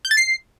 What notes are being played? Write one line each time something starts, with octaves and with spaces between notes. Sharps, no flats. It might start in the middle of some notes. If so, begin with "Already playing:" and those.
G6
A6
C7